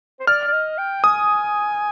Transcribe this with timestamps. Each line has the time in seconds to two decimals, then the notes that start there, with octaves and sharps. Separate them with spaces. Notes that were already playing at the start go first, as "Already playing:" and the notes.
0.20 C5
0.27 D5 F6
0.48 D5
0.52 D#5
0.78 G5
1.04 G#5 D#6